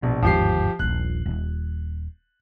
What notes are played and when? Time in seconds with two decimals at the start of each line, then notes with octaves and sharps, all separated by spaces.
0.03 A#1 B2
0.22 G1 D#2 G#2 F3 G4 C7
0.79 D#1 A#1 F#6
1.25 D#1